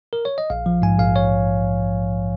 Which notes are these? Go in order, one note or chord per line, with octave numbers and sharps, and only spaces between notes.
A#4
C#5
D#5
A#1 F5
F3
G#2 G#5
A#1 F5
C#5